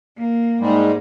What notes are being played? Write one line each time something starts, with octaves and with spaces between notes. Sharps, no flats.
A#3
G#2 G3 G#3